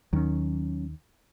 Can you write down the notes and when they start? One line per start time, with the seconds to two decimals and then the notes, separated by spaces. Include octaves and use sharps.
0.13 D#2 D#3 F#3 C4 C#4